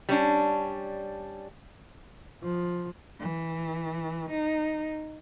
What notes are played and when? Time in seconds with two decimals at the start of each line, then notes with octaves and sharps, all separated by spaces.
0.09 G3 C#4 D4
2.43 F3
3.20 E3
4.30 D#4